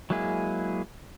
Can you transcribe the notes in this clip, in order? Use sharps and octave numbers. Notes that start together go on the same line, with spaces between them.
F#3 G#3 A#3 E4 G#4